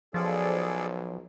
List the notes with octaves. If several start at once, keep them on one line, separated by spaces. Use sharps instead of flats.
B1 F3 G#4 A4 D5